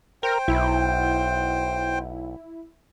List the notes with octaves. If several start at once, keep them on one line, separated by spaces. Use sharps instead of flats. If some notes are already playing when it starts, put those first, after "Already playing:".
A#4 C5 G5
B1 E4